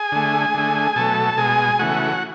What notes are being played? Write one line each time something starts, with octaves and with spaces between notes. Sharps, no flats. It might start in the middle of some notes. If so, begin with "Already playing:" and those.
Already playing: G#4 G#5
D3 A3
D3 A3
B2 F#3 A3 A4 A5
B2 G#3 G#4 G#5
C#3 E3 A3 F#4 F#5